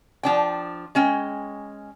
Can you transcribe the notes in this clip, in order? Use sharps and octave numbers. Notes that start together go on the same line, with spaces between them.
F3 D4 G5
G#3 C#4 G5